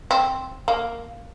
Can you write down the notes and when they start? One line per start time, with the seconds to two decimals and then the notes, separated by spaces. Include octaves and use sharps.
0.11 C4
0.68 A#3